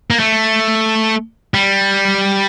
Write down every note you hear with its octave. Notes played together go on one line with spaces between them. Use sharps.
A#3
A3
G3